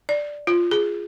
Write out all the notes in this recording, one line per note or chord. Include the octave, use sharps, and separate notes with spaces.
D5
F4
G#4